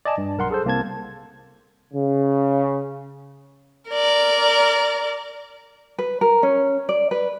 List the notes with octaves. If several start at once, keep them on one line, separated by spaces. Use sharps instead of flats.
D5 D#5 G#5 A5
G2
B1 A#4 F#5 C6
G#4 A4 C5
C2 A#3 C4 A5 G#6
C#3
A#4 D5
B4
A#4
C#4
D5
B4